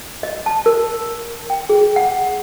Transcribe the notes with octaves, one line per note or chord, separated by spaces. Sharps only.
D#5
A5
A#4
G5
G#4
F#5